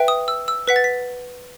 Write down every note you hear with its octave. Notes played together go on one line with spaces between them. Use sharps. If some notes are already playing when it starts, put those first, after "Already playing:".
Already playing: B4 E5 G5
D#6
E6
E6
B4 F#5 B6
A6
B6